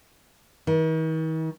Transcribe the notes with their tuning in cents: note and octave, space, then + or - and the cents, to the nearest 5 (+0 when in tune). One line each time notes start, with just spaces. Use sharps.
D#3 +45